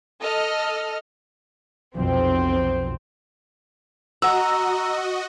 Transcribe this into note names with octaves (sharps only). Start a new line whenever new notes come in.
A4 D#5 F6
B1 F2 C3 C4
F#4 D#5 F#5 A#5 E6